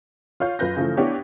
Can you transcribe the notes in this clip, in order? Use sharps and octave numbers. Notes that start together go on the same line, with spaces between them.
F4 C#5 F5 G6
F#2 F4 B4 G6 A#6
C#3 E3 F3 A3
B3 D4 E4 G4 C#5